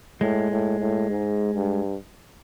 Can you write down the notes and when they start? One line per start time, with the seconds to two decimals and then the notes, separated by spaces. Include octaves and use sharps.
0.21 A2 G#3
0.51 A2
0.81 A2
1.10 G#2
1.55 G2